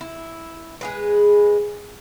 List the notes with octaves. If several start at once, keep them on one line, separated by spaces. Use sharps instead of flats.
E4
G#3 G#4 B4